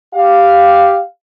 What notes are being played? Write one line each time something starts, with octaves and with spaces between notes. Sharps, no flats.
G4 F5